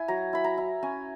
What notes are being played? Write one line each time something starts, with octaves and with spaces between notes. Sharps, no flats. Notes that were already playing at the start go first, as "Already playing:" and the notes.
Already playing: E4 G#5
F#3 A#5
E4 B5
A#5
E4
C#4 G#5